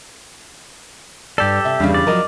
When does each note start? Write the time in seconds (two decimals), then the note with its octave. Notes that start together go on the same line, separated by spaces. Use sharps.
1.38 G2 G4 A4 D5
1.65 C3 E5
1.80 E2 G2 C#3 G3
1.94 D5
2.07 F3 F#3 A#4 D#5